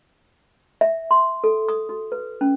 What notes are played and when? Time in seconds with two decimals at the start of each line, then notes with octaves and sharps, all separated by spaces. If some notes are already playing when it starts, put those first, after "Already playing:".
0.81 E5
1.11 C6
1.44 A4
1.69 D#6
1.89 F#4
2.12 B4
2.41 C#4